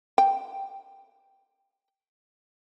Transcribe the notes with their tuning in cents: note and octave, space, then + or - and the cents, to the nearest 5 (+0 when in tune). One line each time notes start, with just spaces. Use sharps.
G5 -10